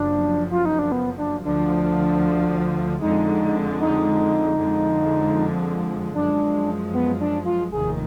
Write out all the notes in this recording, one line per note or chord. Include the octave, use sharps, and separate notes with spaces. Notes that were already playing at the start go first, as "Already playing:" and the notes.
Already playing: F#1 F#2 F3 D4
F4
D#4
D4
B3
D4
D2 D3 F3 D4
F2 D3 G#3 D#4
D#4
F2 D3 F3 G#3
F#2 F3 G#3 D4
B3
D4
F4
F1 D#2 D#3 G#4